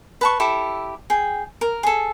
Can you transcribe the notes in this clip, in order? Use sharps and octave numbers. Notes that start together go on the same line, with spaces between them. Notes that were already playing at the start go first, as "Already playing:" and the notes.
B4 A5 C#6
E4 G4 A4
G#4 G5
A#4
G#4 A4